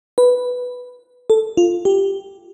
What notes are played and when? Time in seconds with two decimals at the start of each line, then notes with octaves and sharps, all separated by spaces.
0.18 B4
1.30 A4
1.57 F4
1.85 G4